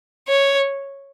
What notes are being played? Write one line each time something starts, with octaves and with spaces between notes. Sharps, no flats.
C#5